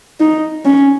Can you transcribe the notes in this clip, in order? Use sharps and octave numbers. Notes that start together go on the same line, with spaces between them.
D#4
C#4